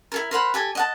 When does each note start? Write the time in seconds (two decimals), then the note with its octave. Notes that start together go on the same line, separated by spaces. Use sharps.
0.12 E4 A4 A#4
0.31 A#4 C5 F#5 B5
0.54 G4 A4 G#5
0.75 D#5 F#5 A5